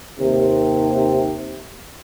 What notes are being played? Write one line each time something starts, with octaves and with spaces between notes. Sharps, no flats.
D#2 C3